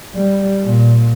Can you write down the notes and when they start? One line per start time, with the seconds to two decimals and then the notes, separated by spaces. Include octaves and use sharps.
0.15 G3
0.64 A#2